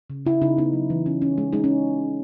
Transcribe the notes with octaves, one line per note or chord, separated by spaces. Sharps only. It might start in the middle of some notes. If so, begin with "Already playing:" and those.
C#3
C#3 E4
C#3 D#4
B3 D#4
F#3
E3
C#4
C#4
G#3
G#3 D#4
C#4